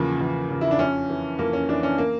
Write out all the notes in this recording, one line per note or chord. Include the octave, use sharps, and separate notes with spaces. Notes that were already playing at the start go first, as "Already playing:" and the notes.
Already playing: E2 C#3 F3 A#3
E2
C#3 F3
E4
D4
F2 C#4
E3
F2 A#3
C#4
E3 D4
C#4
A#3